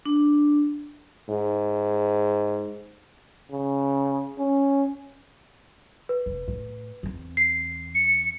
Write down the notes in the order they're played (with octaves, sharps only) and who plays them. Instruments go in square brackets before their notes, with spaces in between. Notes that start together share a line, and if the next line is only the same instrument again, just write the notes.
[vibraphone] D4
[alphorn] G#2
[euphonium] C#3
C#4
[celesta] B4
[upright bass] F1
A2
E2 C4
[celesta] C7
[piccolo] C#7